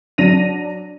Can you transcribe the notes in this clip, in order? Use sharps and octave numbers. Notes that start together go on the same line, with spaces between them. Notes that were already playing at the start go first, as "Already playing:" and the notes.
F#3 D4 A#6 D#7 F7